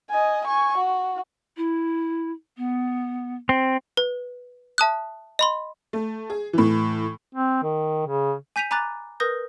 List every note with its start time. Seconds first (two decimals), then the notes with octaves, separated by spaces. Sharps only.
0.10 D#5 G#5
0.45 G#5 C#6
0.78 F#4
1.57 E4
2.57 B3
3.49 C4
3.97 B4
4.78 E5 A5 D#6 F#6
5.39 D#5 B5 C6
5.93 A3
6.30 G#4
6.53 A2 E3
7.35 C4
7.63 D#3
8.06 C#3
8.56 G#5 G6 B6 D#7 F7
8.71 G#5 A#5 B5 D6 F#6 A6
9.20 A#4 B4 D#6 G6 A#6